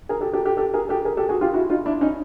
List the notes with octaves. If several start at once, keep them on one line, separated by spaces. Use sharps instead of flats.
G#4 A#4
G4 A4
G4 A4
G4 A4
G4 A4
G#4 A#4
G4 A4
G#4 A#4
G4 A4
F#4 G#4
F4 G4
E4 F#4
D#4 F4
D4 E4
C#4 D#4